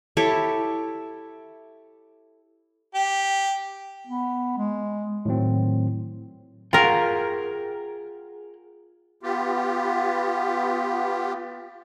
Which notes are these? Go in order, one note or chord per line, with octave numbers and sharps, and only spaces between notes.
E4 G4 A4 C#5
G4
B3
G#3
A2 D#3 F#3 C4
F4 G#4 A#4 F#5 G5
B3 F4 G4